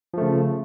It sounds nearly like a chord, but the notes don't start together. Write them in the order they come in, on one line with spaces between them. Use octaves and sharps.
F3 A3 C#3